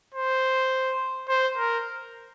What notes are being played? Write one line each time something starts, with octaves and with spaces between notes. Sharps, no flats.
C5
C5
A#4